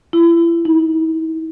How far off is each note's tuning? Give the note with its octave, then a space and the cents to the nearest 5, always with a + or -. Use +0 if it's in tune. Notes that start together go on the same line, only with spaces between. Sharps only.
E4 +35
E4 -45